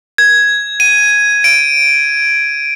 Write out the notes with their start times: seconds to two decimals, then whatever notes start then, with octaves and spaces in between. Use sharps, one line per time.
0.18 G#6
0.80 D#7
1.44 D7